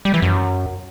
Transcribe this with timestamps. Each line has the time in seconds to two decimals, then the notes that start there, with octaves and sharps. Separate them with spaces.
0.05 G3
0.14 E3
0.22 F#2